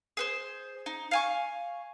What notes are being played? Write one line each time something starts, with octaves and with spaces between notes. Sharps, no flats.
G#4 B4 C5
D#4
F5 G#5 C#6